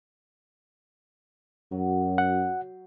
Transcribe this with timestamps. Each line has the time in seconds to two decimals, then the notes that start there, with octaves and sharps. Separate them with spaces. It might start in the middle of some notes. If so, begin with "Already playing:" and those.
1.72 F#2 F#3
2.18 F#5